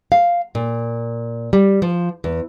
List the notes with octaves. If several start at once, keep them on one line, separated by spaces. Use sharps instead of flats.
F5
A#2
G3
F3
E2